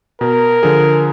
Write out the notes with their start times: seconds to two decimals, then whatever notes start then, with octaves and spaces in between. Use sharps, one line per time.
0.21 B2 A#4
0.63 D3 F3 G#4